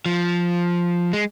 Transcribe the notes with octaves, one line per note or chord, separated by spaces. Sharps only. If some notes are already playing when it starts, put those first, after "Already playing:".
F3
G#3